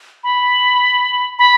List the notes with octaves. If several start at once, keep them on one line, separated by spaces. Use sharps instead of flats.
B5
B5